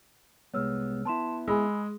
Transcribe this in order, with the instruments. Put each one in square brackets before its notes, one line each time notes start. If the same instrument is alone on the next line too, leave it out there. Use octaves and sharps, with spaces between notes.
[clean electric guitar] C2 G#3 B3 [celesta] C#5 E6 F6
[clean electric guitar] B3 E4 [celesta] A5 C6 E7
[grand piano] G#3 [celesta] G#5 B5 E6